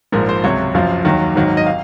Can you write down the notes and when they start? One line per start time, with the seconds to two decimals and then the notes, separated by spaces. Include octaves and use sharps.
0.12 A#1 G#2 F3 A#4
0.29 C5
0.44 C#2 C3 F#3 C#5
0.74 F#1 F#2 F3 F5
1.05 D#2 D#3 F#3
1.36 G#1 G#2 D#3 F#3
1.57 D#5
1.67 F5